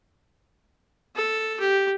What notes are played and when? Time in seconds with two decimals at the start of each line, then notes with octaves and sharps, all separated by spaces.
1.16 A4
1.60 G4